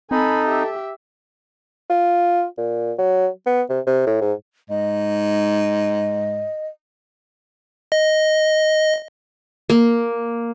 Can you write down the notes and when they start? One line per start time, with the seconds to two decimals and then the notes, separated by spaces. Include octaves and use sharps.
0.11 C4 D#4 A4 G#5 B5
0.48 G4 E5
1.90 F4
2.58 A#2
2.99 F#3
3.46 B3
3.70 C3
3.87 C3
4.06 A2
4.21 G#2
4.70 G#2 D#5
7.92 D#5
9.70 A#3